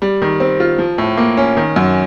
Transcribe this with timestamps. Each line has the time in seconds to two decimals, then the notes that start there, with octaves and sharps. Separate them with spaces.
0.02 G3
0.22 D#3
0.40 C4
0.60 F4
0.79 F3
0.98 A2
1.17 A#3
1.37 C#4
1.57 D#3
1.76 F#2